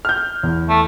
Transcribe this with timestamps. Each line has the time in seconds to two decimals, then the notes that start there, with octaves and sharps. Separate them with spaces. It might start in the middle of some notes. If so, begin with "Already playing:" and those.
0.05 F6 G6
0.43 E2
0.69 A3